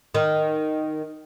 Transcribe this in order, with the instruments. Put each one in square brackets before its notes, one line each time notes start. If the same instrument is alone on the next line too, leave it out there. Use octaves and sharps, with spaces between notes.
[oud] D#3